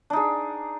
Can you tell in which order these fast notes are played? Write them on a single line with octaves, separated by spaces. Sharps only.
D4 D#4 G#4